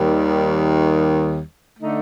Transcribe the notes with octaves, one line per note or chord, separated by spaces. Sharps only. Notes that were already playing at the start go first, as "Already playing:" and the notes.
Already playing: D#2 D#3 G3
D3 A3 D#4